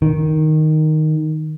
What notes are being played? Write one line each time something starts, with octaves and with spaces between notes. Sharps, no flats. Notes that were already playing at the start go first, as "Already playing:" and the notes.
D#3